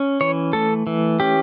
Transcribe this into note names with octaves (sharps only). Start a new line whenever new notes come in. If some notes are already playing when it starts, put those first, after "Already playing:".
Already playing: C#4
E3 C#5
A3 A4
E3
C#4 G4